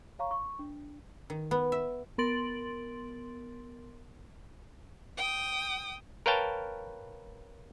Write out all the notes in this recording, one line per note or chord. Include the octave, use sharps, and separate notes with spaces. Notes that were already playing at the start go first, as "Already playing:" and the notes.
C#5 F5 A#5 C#6
C#6
D4
D#3
B3
E5
B3 A#4 C6 A6 D7 F#7
G5 D#6
A#4 B4 C#5 F5 G5 A5